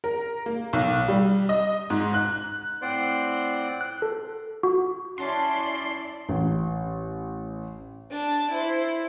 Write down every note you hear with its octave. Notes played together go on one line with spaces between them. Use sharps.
A#4
A#3
B1
G3
D#5
G#2
F#6
A2 C4 C5 D5 F#5 C6
F#6
A4
F#4
C#4 E4 F#4 D5 A5 C6
A1
D4 A5
E4 C5